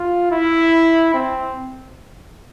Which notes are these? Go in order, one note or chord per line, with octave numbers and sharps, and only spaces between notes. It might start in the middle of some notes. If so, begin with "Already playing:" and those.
Already playing: F4
E4
C4